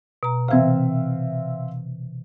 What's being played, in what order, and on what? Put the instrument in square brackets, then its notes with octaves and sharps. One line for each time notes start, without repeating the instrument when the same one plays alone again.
[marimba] B2 A#5
[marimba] C3 E3 [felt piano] C4 E5 F5